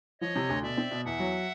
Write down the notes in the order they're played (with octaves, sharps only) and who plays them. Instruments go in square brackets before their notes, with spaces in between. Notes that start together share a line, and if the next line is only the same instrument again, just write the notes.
[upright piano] F3 [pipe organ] C#5 D#5
[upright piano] C3
D2
[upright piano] B2 [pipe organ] D5 E5
[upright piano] C4
B2
[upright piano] E2 [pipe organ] E5 F#5
[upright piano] F#3